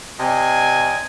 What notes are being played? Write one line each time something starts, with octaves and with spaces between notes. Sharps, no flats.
C3 D5 D#5 G#5